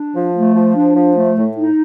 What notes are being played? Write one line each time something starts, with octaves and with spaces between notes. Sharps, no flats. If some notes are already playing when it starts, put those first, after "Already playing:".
Already playing: D4
F3
A3
F3
D4
F3
A3
A2
D#4